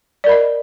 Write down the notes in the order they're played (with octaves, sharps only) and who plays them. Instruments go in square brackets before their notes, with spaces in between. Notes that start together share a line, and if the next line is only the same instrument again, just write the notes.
[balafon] D5
A#4
B5
D#5